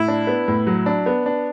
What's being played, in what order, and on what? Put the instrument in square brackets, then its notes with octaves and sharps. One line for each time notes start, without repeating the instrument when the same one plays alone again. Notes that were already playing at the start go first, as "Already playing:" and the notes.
Already playing: [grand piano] A2 [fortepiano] E4
[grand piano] D4
B3
A2
F#3
D4
B3
D4